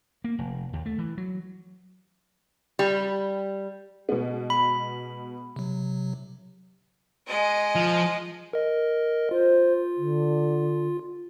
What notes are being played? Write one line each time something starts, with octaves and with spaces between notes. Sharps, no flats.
A#3
F1
D#2
A3
E3
F#3
G3
B2 G#3 B3
B5
C3 F#3
G#3 D#5
F3
A#4 D#5
F4 C5
D3